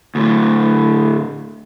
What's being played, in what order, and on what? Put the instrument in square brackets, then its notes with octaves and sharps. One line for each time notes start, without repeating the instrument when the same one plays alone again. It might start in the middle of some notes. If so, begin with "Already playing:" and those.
[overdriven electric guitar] D2 A2